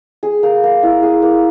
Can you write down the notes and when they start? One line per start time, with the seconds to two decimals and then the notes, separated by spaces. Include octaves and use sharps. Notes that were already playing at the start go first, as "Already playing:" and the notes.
0.23 G#4
0.43 A#3
0.63 A#3
0.83 E4
1.03 G#4
1.22 A#3